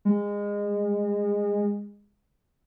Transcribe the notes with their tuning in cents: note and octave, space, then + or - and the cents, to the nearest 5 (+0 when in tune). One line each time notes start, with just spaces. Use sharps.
G#3 -25